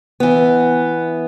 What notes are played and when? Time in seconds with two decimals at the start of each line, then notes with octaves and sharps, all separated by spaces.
0.20 E3 B3